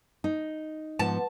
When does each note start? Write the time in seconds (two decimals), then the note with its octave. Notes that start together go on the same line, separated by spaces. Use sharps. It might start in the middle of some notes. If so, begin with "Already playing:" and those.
0.24 D#4
0.99 G#2 F3 B3 B4 F#5 A5